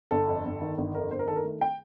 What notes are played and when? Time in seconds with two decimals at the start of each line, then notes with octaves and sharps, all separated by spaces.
0.11 G1 A4
0.28 F2
0.45 G1
0.62 D#3
0.78 G1
0.94 F2 A#4
1.11 G1 C5
1.19 A#4
1.28 D#3 A4
1.36 A#4
1.44 A3
1.61 G5